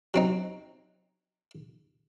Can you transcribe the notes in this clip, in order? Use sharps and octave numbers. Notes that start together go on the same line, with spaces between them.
F#3 C4 D#4